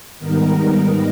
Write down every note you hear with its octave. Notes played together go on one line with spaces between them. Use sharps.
G#2 D#3 G3 B3 D#4 A#4